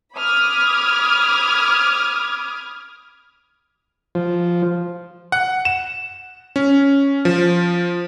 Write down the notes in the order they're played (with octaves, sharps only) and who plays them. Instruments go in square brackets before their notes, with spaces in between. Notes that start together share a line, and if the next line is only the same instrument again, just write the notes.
[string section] B5 D6 D#6 F6 G#6
[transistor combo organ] F3
[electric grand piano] F#5
E7
C#4
F3